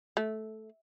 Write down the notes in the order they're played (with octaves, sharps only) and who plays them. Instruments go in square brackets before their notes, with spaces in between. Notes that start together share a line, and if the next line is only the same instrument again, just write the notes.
[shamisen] A3